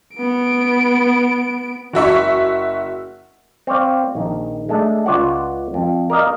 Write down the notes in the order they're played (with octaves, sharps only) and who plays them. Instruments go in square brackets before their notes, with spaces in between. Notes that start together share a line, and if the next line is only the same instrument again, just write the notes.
[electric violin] B3 D7
[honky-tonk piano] F#1 F#4 E5 C#6
[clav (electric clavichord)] C4 C#5 D5 F5
A#1 D#3
G#3 A3 D4
C#2 F4 C#5 D5 F#5
F2
A#4 D5 D#5 F5